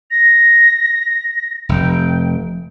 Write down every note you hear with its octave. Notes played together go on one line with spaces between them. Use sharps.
A#6
F1 G5